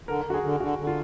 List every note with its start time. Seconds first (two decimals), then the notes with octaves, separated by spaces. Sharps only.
0.07 D3 A#4
0.25 D3 F#4
0.34 G#4
0.43 D3
0.60 D3 F#4
0.79 D3
0.87 F4